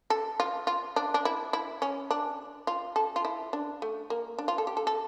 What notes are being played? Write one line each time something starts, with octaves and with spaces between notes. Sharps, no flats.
A4
F4
F4
D4
D4
E4
E4
C#4
D4
F4
A4
F4
E4
D4
A3
A#3
D4
F4
A4
G4
A4
A4